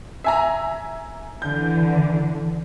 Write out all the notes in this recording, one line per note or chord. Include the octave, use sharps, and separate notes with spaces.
E5 G#5 A#5
D3 E3 G6